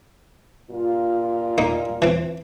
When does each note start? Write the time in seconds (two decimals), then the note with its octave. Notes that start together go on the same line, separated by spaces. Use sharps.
0.70 G2 A#2 F4
1.58 A#3 D#4
2.02 E3 C4